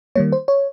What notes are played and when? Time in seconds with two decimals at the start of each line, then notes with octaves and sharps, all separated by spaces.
0.16 D#3 G3 A#3 C#5
0.32 C5
0.48 C#5